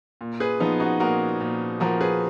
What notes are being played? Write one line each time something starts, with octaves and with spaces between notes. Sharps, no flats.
A#2
G#4 B4
F3 B3 D#4
D#4 F#4
A#2 F#4 A#4
A#2
F3 F#4 A#4
G#4 B4